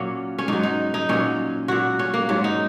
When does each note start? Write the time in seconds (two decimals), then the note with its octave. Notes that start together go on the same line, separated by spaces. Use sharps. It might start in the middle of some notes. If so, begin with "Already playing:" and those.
Already playing: A#2 F#3 A#3 C#4
0.38 C#4
0.48 G#2 F#3 D#4
0.63 D#4
0.94 D#4
1.09 A#2 F#3 C#4
1.68 A#2 F#3 F#4
1.99 C#4
2.14 A#3
2.29 G#2 F#3 C#4
2.44 D#4